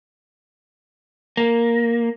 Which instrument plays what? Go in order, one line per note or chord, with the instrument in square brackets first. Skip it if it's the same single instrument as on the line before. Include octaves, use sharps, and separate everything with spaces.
[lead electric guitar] A#3